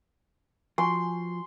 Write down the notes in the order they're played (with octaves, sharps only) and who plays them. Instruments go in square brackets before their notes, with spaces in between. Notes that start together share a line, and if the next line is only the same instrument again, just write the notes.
[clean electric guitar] F3 [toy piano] F#4 G#5 C#6 [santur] C6